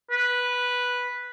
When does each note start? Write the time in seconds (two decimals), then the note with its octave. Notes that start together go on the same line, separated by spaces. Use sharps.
0.11 B4